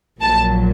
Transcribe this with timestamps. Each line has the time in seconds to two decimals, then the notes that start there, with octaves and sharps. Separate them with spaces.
0.20 A#1 A#2 F#3 A5